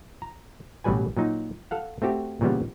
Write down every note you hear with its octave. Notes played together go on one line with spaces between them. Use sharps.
A#5
A1 B2 F#3 G3 B4 G#5
A#2 F#3 D#4
A4 F5 F#5
A3 C4 F#4 G4
A#2 C#3 E3 G3 B3